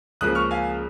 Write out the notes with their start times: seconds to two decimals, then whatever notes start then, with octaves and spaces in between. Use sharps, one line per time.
0.21 C#2 C#3 F3 A#3 D#6 F#6
0.35 C#6 F6
0.51 F5 G#5